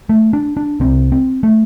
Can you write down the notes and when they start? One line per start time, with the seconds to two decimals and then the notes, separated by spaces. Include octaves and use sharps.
0.09 A3
0.33 D4
0.57 D4
0.80 C2 C3 C4
1.12 C4
1.43 A3